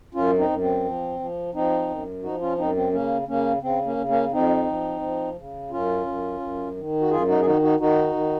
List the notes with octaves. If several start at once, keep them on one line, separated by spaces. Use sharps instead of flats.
F#2 C#4 F4
C4 D#4
F#2
C4
F3
F3
F3 C4 D#4
F#2
F3 D#4 F#4
C#4 F4
F#2 C4 D#4
C4
C#3 A#3 C#4
C#3 A#3 C#4
C#3 C4
A#3 C#4
C#3
A#3 C#4
F2 C4 D#4
F3
F3
C#3
F#2 C#4 F4
F#2
F#2
D#3
F#4
F#2 F4 G#4
D#4 F#4
G#4
D#3 D#4 F#4
D#4 F#4
D#3 D#4 F#4
D#3